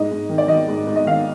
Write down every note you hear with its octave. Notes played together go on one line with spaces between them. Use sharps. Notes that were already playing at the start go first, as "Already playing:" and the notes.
Already playing: G#2 D#5
G#2
D#3
D5
D#3 D#5
G#2
G#2
D#5
D#3 F5